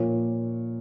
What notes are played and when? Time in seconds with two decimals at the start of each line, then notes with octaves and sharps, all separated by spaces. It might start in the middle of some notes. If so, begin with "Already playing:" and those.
Already playing: A#2 F3 C#5